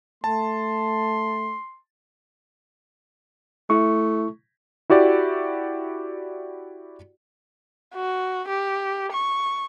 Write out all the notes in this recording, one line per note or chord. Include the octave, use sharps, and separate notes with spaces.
A3 A5 C6
A3 E4 C#6
E4 F#4 G4 D5
F#4
G4
C#6